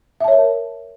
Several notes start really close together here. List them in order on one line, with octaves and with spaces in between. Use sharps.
E5 A5 C#5 A#4